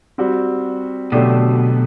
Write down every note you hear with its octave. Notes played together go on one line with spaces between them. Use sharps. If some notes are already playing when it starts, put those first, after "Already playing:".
G3 C4 F#4
B2 D3 F#3 A3 D4 G4